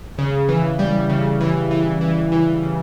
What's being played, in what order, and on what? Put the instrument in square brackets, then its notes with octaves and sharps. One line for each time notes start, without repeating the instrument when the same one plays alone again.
[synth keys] C#3
E3
G3
C#3
E3
E3
E3
E3
C#3